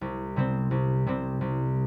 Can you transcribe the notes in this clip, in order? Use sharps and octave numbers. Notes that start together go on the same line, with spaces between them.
C2
C3 G3 C4
C2
C3 G3 C4
C2